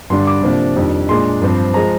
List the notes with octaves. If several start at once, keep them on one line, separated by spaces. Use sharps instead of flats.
G2 D3 G3 D4 C6
D6
C3 F3 A#3 D4
F2 D#3 G3 D4
A#2 G#3 D4 C6
G2 F3 C4
F3 G#3 A#5